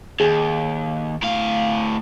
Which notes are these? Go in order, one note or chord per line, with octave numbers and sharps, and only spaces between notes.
D#2 G#4
A2 F5